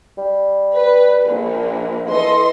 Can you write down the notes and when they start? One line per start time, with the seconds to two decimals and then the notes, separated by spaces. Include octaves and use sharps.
0.18 G3
0.75 B4
1.27 A#1
2.11 E3 A4 D#5 C6